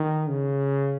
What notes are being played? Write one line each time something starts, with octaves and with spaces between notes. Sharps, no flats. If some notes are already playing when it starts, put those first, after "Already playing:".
Already playing: D#3
C#3